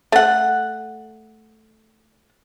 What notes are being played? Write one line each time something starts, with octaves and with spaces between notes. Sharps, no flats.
A3 F#5